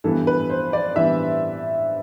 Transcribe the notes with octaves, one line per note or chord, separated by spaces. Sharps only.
G2 E3 B3 A4
B4
C5
D5
G2 E3 B3 E5